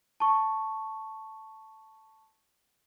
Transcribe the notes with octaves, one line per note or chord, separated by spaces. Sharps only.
A5 C#6